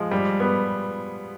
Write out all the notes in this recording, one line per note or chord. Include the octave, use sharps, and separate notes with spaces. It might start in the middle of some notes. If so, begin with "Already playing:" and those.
Already playing: F3 G#3
G3
B3